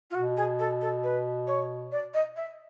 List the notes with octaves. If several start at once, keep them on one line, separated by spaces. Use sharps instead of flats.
F4
B2 F#4
G#4
A4
A4
B4
C#5
D5
D#5
E5